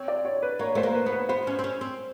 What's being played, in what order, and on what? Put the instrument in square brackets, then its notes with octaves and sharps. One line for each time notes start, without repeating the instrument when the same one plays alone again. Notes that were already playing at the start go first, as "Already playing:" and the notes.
Already playing: [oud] C4 [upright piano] C#5
[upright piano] D5
C#5
B4
[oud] A#3 [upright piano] C#5
[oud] A3 [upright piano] C5
[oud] A#3
[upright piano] B4
[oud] B3
[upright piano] B4
[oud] B3 [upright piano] C5
[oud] C#4
C4
C#4
C4